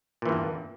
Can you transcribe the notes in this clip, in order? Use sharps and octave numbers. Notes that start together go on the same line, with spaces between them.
E2 G2 A#2 E3